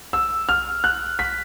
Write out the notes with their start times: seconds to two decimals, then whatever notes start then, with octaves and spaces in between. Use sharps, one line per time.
0.13 E6
0.49 F6
0.84 F#6
1.19 B6